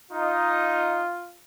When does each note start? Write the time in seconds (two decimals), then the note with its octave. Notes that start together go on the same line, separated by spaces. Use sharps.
0.11 D#4 F4